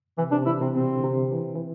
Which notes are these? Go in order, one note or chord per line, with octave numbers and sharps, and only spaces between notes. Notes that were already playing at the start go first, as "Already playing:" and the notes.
C3 E3
C3 D4
E3 E4
C3 C4
B2 C4
D3
C3
E3
E3